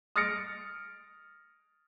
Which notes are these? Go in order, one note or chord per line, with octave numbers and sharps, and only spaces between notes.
D#6 F6 A6 A#6 C#7 D7